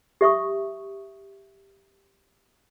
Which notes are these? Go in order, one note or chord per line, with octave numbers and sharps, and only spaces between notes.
G4 E5 C#6 D#6